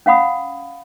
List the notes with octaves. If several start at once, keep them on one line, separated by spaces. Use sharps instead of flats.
C#4 F5 F#5 B5 D#6